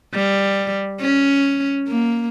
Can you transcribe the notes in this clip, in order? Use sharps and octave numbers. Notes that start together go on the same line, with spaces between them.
G3
C#4
A#3